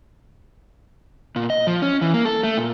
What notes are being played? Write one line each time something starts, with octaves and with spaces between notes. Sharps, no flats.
A#2
D#5
F3
C#4
E3
A#3
A4
A3
A#2